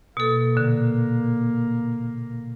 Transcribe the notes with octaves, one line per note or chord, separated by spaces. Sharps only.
B2 A#3 A4
A#2 D3